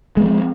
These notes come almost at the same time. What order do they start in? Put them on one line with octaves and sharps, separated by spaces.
G#3 B3 F3 C4